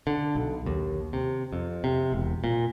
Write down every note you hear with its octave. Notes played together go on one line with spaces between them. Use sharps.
D3
B1
D#2
C3
F2
C3
E1
A#2